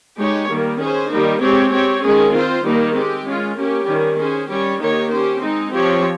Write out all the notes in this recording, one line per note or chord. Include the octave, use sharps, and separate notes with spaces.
G#3 D#4 G4 C#5
D#3 G3 A#3
C#4 G#4 C5
D#3 G3 A#3 D#4
G#3 C4 G4 C#5
C4 G4 C#5
D#3 G#3 C#4 G#4
C4 F4 C5
D#3 G3 A#3 D#4
G#3 C4 G4
G#3 C#4 F4
A#3 C#4 G4
D#3 G3 C#4
C#4 G#4 C5
G3 C#4 G4 C#5
D#3 A#3 D#4 G4 C#5
C#4 G4 C5
G#3 C4 D#4
F3 C4 G4 C#5